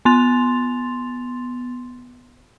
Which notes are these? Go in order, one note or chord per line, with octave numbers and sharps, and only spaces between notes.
B3 C6 A6 F7